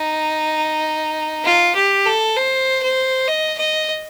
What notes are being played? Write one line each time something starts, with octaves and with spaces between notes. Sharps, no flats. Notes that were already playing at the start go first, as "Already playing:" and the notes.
Already playing: D#4
F4
G4
A4
C5
C5
D#5
D#5